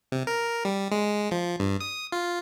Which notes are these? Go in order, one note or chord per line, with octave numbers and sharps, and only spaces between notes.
C3
A#4
G3
G#3
F3
G2
D#6
F4